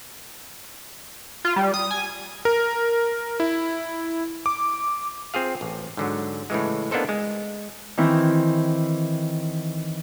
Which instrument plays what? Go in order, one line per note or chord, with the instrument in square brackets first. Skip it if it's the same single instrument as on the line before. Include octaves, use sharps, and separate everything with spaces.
[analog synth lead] F4
G3
D#6
G#5
[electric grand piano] A#4
E4
D6
[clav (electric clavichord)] C4 F4 G#4 F5
A1
G#2 D3 F#3
A2 C#3 E3 G#3
A#3 B3 D4 D#4 A4 C5
G#3
[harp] D#3 E3 C4 E4